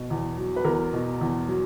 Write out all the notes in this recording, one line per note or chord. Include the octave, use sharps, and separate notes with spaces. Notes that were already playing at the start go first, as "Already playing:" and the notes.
Already playing: B2
E2
F#3
B4
E2 A#4
B2
E2
F#3